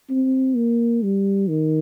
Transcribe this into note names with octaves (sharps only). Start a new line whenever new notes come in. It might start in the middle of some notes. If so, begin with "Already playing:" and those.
C4
A#3
G3
D#3